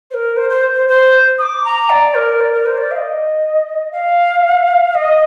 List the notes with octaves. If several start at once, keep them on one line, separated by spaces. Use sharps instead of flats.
C5
A#4
C5
C5
C5
C5
D#6
D6
A#5
D5
A#4
D5
A#4
C5
D5
F5
D#5
F5
D#5